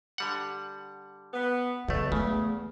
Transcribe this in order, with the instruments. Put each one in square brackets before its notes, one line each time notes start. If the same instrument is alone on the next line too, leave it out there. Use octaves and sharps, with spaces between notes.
[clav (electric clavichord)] D3 G3 F#5
[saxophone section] B3
[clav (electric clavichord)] B1 A3 [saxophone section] E2 [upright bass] C#3
[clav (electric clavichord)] C#3 [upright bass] A3